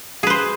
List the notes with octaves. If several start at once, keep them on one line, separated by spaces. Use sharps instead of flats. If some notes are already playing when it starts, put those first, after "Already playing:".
G#4 B4 C5